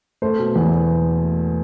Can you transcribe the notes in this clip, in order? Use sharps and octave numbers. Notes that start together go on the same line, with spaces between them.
A3 C5
B2
E2